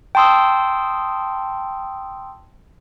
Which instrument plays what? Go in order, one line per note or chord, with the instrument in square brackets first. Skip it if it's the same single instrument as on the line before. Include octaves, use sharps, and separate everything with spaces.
[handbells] G5 A5 C6 D#6 E6